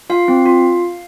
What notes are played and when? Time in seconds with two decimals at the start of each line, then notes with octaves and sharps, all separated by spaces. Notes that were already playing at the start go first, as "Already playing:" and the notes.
0.10 F4 F5
0.28 C4
0.46 F4